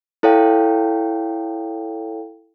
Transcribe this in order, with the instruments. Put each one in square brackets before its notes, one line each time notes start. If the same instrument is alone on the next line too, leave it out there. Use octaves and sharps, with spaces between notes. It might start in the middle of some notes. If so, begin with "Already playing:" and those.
[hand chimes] E4 A4 C#5 F5 G5